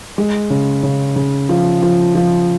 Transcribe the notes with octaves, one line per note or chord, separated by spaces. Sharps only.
G#3
C#3
C#3
C#3
F3
F3
F3